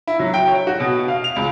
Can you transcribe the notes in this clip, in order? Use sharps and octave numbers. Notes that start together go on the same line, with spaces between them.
E4
F#3
G5
C#5
F#4
B2
F5
F7
C#2